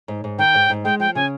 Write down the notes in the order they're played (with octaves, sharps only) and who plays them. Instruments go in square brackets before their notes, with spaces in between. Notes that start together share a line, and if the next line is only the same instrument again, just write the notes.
[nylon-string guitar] G#2
G#2
[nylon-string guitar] D#3 [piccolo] G5
[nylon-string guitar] G#2
G#2
[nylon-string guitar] G#3 [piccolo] G5
[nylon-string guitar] F3 [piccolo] G5
[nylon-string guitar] C#3 [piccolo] G#5